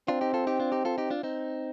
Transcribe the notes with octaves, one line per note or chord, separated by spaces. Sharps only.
C4 D4 F4
D#4 G4
F4 A4
D#4 G4
D4 F4
D#4 G4
F4 A4
D#4 G4
D4 F4
C4 D#4